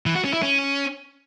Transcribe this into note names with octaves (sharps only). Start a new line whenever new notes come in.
E3
F#4
C#4
E4
C#4